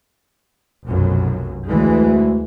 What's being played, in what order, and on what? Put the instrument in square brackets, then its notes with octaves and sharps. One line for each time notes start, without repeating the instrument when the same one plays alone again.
[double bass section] F1 B1 F#2
[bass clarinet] D2 [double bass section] D3 E3 G#3